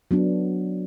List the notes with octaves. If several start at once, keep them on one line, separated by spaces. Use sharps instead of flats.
F#3 B3 D4